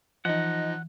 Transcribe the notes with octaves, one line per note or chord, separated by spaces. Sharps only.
E3 F3 D#4 D#5 F#5